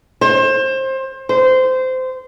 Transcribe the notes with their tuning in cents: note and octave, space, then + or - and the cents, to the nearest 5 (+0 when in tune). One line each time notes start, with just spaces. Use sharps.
C5 +25
C5 -20